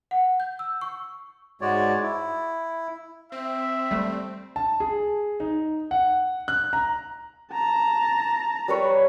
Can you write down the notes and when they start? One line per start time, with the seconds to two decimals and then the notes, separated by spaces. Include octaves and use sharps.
0.11 F#5
0.40 G6
0.59 E6
0.81 C#6
1.61 G#2 G#3 F#4 C#5 D5
2.02 E4
3.32 C4 E5
3.91 G3 A3
4.56 A5
4.80 G#4
5.40 D#4
5.91 F#5
6.48 F#6
6.73 A#5
7.52 A5 A#5
8.68 G3 B4 C#5